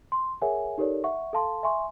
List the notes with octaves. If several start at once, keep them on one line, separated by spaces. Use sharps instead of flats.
C6
G#4 A#4 C#5 E5 F#5 G#5
D#4 G4 A4 A#4 C#5 D5
E5 F#5 C#6
A4 F5 A5 C6
E5 G#5 C6 C#6